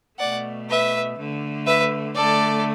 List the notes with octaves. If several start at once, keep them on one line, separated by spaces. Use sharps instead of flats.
B2 A3 D5 F#5
B4 E5
D3 A3
B4 E5
D3 A3 A4 D5